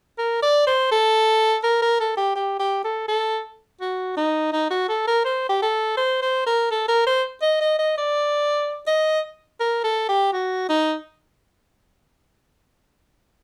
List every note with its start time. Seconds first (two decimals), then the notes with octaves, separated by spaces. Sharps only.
0.18 A#4
0.42 D5
0.67 C5
0.91 A4
1.64 A#4
1.82 A#4
2.00 A4
2.17 G4
2.36 G4
2.59 G4
2.84 A4
3.08 A4
3.81 F#4
4.17 D#4
4.52 D#4
4.70 F#4
4.88 A4
5.07 A#4
5.25 C5
5.49 G4
5.62 A4
5.97 C5
6.22 C5
6.46 A#4
6.71 A4
6.88 A#4
7.06 C5
7.42 D#5
7.61 D#5
7.79 D#5
7.98 D5
8.87 D#5
9.60 A#4
9.84 A4
10.09 G4
10.33 F#4
10.69 D#4